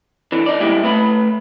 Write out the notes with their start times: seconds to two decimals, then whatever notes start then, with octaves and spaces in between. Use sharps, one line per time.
0.32 D3 E3
0.46 D#4 D5
0.60 A#2 G3 G#3 E4 G4
0.83 A3 B4 B5